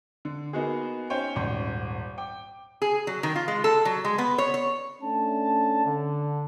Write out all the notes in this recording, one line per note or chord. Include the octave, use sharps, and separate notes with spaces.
D3
A#3 B3 D#4 F#4 G#4
C#4 D#4 C5 C#5 G5
D#1 G#1 C6
G5 D6
G#4
F#3
D#3
F4
G#3
A4
F#3
G#3
B3
C#5
C#5
A3 C#4 D4 A5
D3